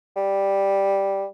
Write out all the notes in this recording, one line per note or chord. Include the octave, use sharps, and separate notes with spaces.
G3